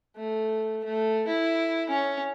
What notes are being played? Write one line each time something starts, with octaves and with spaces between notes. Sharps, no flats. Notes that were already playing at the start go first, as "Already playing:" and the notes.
A3
A3
E4
C#4